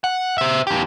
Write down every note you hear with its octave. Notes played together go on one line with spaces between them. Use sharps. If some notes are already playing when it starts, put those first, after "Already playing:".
F#5
C5 E5
E2 G4